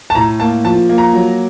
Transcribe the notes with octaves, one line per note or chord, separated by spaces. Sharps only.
A5
A2 A#5
A#3 A5
F3 A5
A#3
A#5
F#3